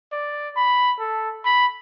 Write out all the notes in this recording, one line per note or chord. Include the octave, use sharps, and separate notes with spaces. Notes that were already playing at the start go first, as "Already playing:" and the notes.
D5
B5
A4
B5